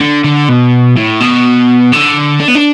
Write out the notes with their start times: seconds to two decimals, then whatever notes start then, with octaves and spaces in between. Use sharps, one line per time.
0.01 D3
0.24 D3
0.49 B2
0.97 A2
1.20 B2
1.93 D3
2.40 D4
2.48 B3
2.55 D4